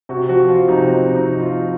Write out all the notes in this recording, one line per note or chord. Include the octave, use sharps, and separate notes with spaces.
C3 F#4
F3 F#4
F3 F4
C3 D#4
F3 C4
C3
D#4
C3
F4
F3